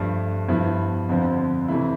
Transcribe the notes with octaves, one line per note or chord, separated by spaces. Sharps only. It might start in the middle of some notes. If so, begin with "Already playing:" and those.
Already playing: G2 F3 A3 D4
G2 F3 B3 E4
F2 D3 F3 C4
C3 E3 A3 E4